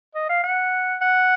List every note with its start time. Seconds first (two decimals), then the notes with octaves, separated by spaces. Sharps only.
0.15 D#5
0.29 F5
0.44 F#5
1.02 F#5